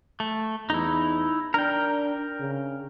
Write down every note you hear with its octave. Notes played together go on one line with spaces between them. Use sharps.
A3
E2 D#4 E4
D4 A#4 G5
C#3